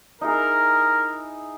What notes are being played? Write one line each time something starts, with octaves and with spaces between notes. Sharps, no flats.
D#4 E4 G#4 A#4